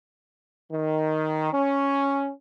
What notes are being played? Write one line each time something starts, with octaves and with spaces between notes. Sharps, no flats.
D#3
C#4